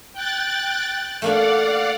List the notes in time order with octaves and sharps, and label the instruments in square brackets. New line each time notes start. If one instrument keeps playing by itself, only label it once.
[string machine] G5 F#6 A6
[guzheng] A3 A#3 D4 [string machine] D5 F5 F#5